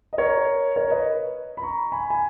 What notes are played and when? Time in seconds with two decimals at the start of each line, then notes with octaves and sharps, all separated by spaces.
0.13 D#5
0.18 A#4 C#5
0.76 A#4 C#5
0.91 B4 D#5
1.57 B5
1.62 A#5 C#6
1.92 G#5 B5
2.10 G#5